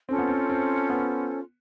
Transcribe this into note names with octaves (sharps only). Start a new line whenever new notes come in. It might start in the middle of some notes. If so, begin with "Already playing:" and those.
C4 C#4 F4 A4 C5
B3
C4
C4
B3